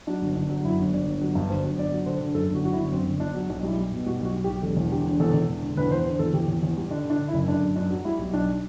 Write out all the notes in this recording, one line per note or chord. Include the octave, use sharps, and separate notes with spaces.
F#3 D4
G1
G1 D4
F#3
F#2 E4
G1
G1 D5
G1
F#3
G2
G1 C5
F#3
G1 D5
F#3
D3 C5
D3
F#2 A4
G1 F#4
F#3 F#4
E4
G1
F#2 C4
G1
G1 D4
F#3
B1 D4
G3 E4
G3
B2
G3 F#4
B1
F#4
B1
G4
B1
E1 A4
E2
D3 G4
E1
E2 A4
E2
E1
D3
E2 B4
E2 C5
D3 C5
E2 A4
E2 G4
E2
E2
G3
D3 D4
D3 D4
D3
E4
F#1
D3 D4
F#2
F#2 D4
F#3
G3 E4
B1
B1 D4